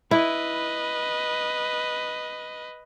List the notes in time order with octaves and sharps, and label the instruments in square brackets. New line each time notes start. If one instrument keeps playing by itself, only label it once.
[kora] E4 [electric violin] B4 D#5